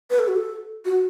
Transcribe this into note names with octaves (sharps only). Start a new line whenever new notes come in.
B4
A4
F#4
A4
F#4